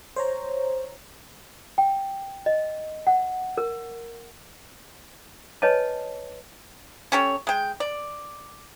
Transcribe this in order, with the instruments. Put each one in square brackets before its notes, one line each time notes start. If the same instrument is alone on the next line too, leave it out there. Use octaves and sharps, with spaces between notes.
[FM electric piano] C5 C#5 A#5
[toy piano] G5
D#5
F#5
A#4
B4 C#5 D#5 G#5 A5
[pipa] C#4 G4 A4 C#5
G#3 G5
D5